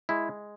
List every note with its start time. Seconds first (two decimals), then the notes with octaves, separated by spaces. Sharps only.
0.09 G#3 E4